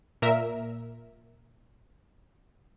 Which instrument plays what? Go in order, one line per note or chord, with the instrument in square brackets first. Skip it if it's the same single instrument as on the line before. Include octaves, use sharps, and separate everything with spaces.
[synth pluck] A#2 A#4 E5